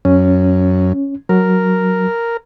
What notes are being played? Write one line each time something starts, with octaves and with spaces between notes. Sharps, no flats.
F#2 C#4
F#3 A#4